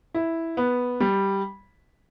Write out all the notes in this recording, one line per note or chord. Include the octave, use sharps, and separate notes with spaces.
E4
B3
G3